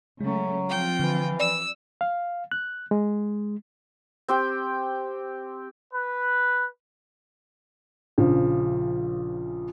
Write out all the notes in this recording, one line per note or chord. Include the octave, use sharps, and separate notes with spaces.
C#3 F#3 G#3 A3 C#4
F3 C4 F4 G5
D3 E3
D5 E6
F5
F#6
G#3
C4 G4 G5
B4
A#1 C#3 F3